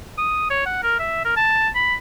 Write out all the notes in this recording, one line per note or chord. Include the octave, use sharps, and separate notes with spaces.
D#6
C#5
F#5
A#4
E5
A#4
A5
B5